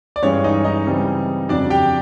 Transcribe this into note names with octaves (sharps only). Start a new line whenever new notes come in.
D5
G2 E3 G#3 C#4 C#5
D#4 D#5
D#4 D#5
C#3 E3 G3 C4
F2 C#3 F#3 D4 D5
G4 G5